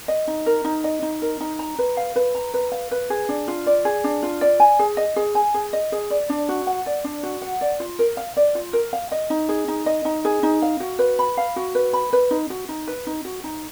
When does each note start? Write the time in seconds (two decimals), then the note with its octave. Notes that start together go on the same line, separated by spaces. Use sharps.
0.08 D#5
0.27 D#4
0.46 A#4
0.64 D#4
0.84 D#5
1.02 D#4
1.22 A#4
1.40 D#4
1.59 A#5
1.78 B4
1.97 F5
2.16 B4
2.35 A#5
2.54 B4
2.72 F5
2.91 B4
3.10 G#4
3.29 D4
3.48 F4
3.66 D5
3.85 G#4
4.04 D4
4.22 F4
4.41 D5
4.60 G#5
4.79 G#4
4.97 D#5
5.16 G#4
5.35 G#5
5.54 G#4
5.73 D#5
5.92 G#4
6.10 D5
6.29 D4
6.49 F#4
6.67 F#5
6.86 D5
7.04 D4
7.23 F#4
7.42 F#5
7.61 D5
7.80 F4
7.99 A#4
8.17 F5
8.37 D5
8.55 F4
8.73 A#4
8.93 F5
9.11 D#5
9.30 D#4
9.49 G#4
9.68 D#4
9.86 D#5
10.05 D#4
10.25 G#4
10.43 D#4
10.62 F5
10.80 F#4
10.99 B4
11.19 B5
11.37 F5
11.56 F#4
11.75 B4
11.93 B5
12.13 B4
12.31 D#4
12.50 F#4
12.69 D#4
12.87 B4
13.07 D#4
13.25 F#4
13.44 D#4